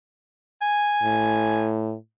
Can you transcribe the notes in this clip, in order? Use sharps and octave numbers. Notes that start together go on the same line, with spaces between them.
G#5
A2